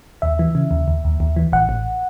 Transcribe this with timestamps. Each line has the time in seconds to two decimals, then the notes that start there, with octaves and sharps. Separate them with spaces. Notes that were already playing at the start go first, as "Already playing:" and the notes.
0.22 D#2 E5
0.39 E3
0.55 C#3
0.71 D#2
0.88 D#2
1.05 D#2
1.20 D#2
1.36 E3
1.53 A1 F#5
1.69 A1